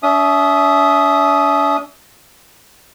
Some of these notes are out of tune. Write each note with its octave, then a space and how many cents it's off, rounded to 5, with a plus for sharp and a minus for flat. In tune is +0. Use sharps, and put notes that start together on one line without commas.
D4 -45 E5 +0 D#6 +0